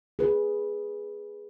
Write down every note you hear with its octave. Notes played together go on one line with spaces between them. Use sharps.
G#4 B4